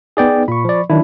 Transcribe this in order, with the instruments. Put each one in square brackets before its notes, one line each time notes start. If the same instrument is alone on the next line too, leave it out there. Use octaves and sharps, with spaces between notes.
[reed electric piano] B3 D#4 [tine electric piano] G#4 D5 G5
[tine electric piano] A#2 [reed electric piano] B5 C#6
[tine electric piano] F3 D5
[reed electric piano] D#3 [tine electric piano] F#3 D4 E4